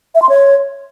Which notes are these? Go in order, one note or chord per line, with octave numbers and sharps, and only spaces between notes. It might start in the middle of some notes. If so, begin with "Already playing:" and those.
E5
C6
C#5